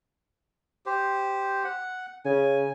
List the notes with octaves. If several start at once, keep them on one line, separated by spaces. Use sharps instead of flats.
G4 C5
F#5
C#3 G#5